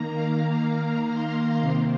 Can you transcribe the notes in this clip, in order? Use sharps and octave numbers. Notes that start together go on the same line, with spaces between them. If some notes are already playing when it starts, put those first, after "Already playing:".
Already playing: D#3 A#3 A#5
F5
A#5
C6
C3 D#3 C4